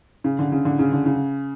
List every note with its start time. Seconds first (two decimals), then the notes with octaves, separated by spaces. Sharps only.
0.24 C#3
0.39 D3
0.52 C#3
0.65 D3
0.79 C#3
0.92 D3
1.06 C#3